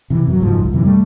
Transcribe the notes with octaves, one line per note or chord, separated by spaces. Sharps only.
C3 E3
F#2 F#3
F#1 G#2 F3
C2
F#2 C3 E3
G3 A3